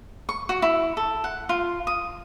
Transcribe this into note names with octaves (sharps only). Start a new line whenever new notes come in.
C#6
F#4
E4
A4
F#5
F4
D#6